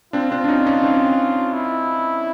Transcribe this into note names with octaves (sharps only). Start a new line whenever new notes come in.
C4 D4 F4
C4 D4
D4
C#4 D#4
C#4 D#4
C4 D4
E4